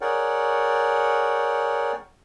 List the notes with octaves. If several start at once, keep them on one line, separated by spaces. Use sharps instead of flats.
G#4 A#4 C#5 D5 F#5 G5